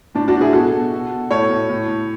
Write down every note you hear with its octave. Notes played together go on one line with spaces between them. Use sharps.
A2 D4
D4 F#4
A2
E4 G#4
B2 F#4 A4
B2
B2
B2
A2 A4 C#5
A2
A2
A2